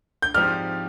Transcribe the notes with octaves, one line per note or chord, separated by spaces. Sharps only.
G6
G#2 F3 C4 G4 D5 F6